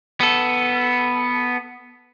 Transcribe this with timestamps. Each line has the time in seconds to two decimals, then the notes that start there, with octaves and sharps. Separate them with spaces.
0.20 B3 A4